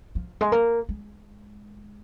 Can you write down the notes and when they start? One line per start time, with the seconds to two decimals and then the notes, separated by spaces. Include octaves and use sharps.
0.15 F3
0.41 G#3
0.52 A#3
0.89 G#3